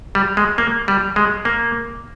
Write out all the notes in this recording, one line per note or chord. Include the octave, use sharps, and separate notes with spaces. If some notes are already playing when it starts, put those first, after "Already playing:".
G3
G#3
A#3
G3
G#3
A#3